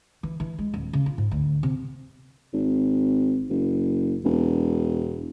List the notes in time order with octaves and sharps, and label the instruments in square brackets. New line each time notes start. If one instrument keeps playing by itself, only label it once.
[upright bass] E3
E3
G#3
D#1
C#3
F4
G#2
D2
C3
[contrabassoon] G#1
F#1
E1